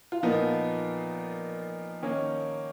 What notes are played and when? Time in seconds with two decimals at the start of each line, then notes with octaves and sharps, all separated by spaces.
0.12 F4
0.23 A#2 F3 A#3 B3 D#4
2.03 D#3 A#3 C#4